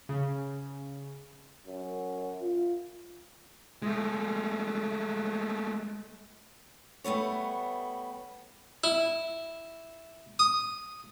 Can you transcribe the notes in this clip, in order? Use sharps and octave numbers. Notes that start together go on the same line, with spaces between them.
C#3
F#2
F4
G#3 A3
G3 A3 B3 C#5
E4
D#6